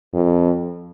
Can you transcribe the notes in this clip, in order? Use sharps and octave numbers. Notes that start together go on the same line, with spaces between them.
F2